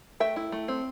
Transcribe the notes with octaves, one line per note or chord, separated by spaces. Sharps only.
A3 E5 G5
E4
A3
C4